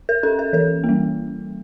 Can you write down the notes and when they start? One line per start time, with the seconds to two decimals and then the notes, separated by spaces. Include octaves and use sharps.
0.09 A#4
0.23 C#4 A4
0.39 A#4
0.53 E3 A#4
0.84 A#3
0.89 G3